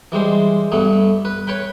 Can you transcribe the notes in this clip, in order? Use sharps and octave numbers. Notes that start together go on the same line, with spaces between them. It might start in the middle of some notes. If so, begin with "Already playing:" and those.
E3 G3 G#3 C5
G2 A3 B3
B4
B4 C#5 G5 B5